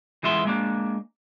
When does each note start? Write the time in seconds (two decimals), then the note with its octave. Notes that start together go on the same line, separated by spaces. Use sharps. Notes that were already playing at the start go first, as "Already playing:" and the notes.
0.23 E3 G#3 B3 F4 E5 C6
0.45 G#3 A#3 D4